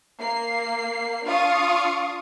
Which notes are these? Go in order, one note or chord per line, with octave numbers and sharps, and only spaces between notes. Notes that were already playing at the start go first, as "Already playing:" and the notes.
A#3 C7
D4 F4 F5 C#6 D#6